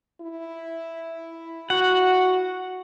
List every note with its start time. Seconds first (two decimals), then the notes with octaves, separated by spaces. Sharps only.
0.21 E4
1.70 F#4 F#5